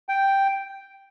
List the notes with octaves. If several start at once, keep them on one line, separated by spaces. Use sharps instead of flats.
G5